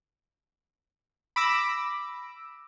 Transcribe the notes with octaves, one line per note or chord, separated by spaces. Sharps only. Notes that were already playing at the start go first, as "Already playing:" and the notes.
B5 D6 E6 A#6